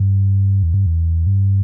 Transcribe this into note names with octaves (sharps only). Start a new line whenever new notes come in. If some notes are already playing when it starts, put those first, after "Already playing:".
Already playing: G2
E2
G2
E2
G2